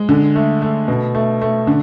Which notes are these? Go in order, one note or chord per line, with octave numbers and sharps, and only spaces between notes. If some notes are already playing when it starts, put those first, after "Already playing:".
Already playing: G#3
D3
A3
A3
B2
A3
A3
D3